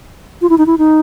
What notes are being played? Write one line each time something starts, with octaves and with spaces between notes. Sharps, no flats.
F4
E4
D#4
E4
D#4